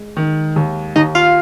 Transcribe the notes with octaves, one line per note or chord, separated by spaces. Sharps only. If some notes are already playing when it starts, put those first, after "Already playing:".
Already playing: G#3
D#3
D#2
D#2 D#4 D#5
F4 F5